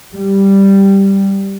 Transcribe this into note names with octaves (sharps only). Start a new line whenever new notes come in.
G3